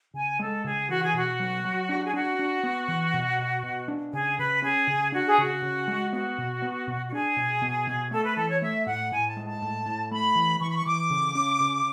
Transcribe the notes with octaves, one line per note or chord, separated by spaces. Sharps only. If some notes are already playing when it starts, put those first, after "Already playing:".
C#3 G#5
G#3 A4
C#3 G#4
E3 F#4
G#4
B2 F#4
F#3
F#3
D4
G#4
D4 F#4
D4
B3
E3
B2
B2
B2
D4
C#3 G#4
C#3 B4
C#4 G#4
C#3
D4 F#4
G#4
C#3 F#4
C#3
G#3
B3 F#4
B2
B3
B2
F#4
D4 G#4
B2
B2
B2
A3 A4
B4
E3 A4
C#5
A3 E5
A2 F#5
A2 G#5
A5
G#3
A5
A2
A2
A3 B5
E3
E3 C#6
B5
C#6
E3 D6
C#3
C#4
C#3